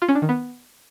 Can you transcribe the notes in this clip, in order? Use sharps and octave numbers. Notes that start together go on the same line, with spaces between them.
F4
C#4
D4
D#3
B3